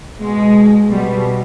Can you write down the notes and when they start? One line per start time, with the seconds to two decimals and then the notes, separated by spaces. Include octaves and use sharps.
0.19 B2 G#3
0.88 B2 G3